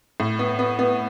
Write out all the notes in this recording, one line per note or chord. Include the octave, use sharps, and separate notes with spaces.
A2
B3
B3
B3